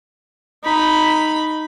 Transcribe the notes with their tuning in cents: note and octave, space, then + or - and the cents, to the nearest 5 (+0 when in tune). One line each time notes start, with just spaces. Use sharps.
D#4 +0 B5 +0